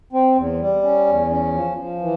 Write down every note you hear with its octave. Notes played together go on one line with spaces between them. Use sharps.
C4
E2
G3
C#4
E2
C#4
F3
F3
E3